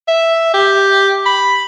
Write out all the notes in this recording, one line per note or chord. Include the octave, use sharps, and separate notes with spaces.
E5
G4
B5